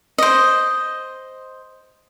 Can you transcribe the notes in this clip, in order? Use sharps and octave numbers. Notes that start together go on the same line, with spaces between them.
C5 D#5